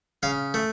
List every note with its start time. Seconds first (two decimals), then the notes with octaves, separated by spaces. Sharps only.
0.23 C#3 F5
0.54 A3